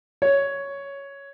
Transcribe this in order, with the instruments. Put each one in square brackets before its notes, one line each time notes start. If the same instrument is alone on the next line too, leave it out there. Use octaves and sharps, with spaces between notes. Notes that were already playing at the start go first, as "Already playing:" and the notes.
[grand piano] C#5